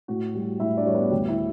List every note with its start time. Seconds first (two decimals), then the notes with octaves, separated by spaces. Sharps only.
0.08 A2 F#4
0.35 G3
0.60 A2 E4 E5
0.77 D4 D5
0.86 G3 C#5
0.94 B3 B4
1.11 D2 G3 G4
1.29 E4